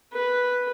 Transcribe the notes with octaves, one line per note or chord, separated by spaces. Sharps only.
B4